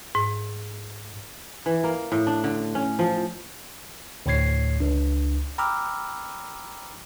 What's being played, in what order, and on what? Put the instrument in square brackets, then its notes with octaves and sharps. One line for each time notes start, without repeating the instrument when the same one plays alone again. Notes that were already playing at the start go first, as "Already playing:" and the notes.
[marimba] G#2
[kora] E3
A#3
A2
D4
D3
C#4
F3
[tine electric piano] D2 A2 D3 C#5 G#6 C7
C#2 D4
G5 A#5 B5 D6 E6 F6